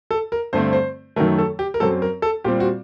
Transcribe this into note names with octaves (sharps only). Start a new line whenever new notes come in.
A4
A#4
G2 D3 A3 C4 C5
C5
F#2 D#3 F#3 A3 A#4
A4
G4
A#4
F#2 F#3 C4 A4
A#4
A4
A#2 G3 C4 G4
F#4